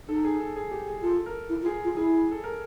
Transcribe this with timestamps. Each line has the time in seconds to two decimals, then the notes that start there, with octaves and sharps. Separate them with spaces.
0.09 D#4 A4
0.24 G#4
0.40 A4
0.56 G#4
0.71 G4
0.88 G#4
1.02 F4 A4
1.26 A#4
1.49 E4
1.62 F4
1.66 G#4
1.84 F4
1.96 E4 G#4
2.31 A4
2.44 A#4